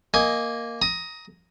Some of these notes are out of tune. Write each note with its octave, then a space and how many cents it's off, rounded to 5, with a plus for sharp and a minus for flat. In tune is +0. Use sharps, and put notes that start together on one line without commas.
A#3 +0 D#5 +0 G#5 +0
A#5 +0 D#6 +20